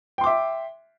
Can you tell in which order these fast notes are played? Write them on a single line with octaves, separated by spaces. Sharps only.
G5 C6 D6 E5